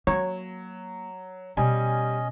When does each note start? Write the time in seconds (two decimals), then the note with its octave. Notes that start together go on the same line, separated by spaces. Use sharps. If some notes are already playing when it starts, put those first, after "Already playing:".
0.07 F#3 A#3 C#5
1.57 B2 G3 C#4 D#5 G#5